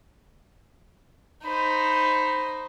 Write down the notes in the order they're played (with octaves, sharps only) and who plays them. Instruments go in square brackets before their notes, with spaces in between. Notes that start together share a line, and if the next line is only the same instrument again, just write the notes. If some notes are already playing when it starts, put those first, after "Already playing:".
[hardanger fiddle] D#4 C5 [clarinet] B5